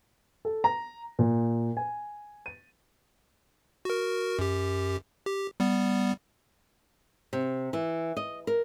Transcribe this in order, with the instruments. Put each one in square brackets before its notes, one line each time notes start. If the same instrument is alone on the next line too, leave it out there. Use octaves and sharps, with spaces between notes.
[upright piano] A4
A#5
A#2
G#5
D#7
[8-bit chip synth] F#4 A#4
F#2 G4
G4
G3 B3
[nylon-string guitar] C3
E3
D#5
A#4